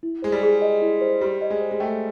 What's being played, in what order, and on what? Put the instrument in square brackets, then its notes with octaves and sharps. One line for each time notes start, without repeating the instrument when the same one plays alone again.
[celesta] E4
[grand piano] G#3 [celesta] C5
[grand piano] G3
[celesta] G#4
D#5
E4
C5
[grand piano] G3 [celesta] G4
[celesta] D#5
[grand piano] G#3
[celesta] C5
[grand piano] G#3
[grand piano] A3 [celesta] G5